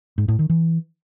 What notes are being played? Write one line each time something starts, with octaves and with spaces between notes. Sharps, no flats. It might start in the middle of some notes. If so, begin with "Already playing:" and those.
G#2
A2
D#3
E3